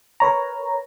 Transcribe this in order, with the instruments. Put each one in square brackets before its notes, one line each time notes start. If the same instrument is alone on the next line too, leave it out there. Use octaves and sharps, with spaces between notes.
[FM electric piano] A#4 B4 C#5 A#5